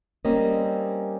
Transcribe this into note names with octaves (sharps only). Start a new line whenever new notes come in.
G3 A#3 C4 C#4 D#5